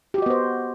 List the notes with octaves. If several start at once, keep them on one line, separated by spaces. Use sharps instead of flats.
B3 F#4 G4 C5 D#5